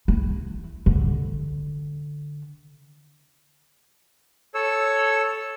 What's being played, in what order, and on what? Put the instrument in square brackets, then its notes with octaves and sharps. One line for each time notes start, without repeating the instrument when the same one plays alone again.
[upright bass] E4
D3
[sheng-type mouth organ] A4 C#5 E6